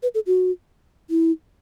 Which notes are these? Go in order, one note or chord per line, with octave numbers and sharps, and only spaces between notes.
B4
A4
F#4
E4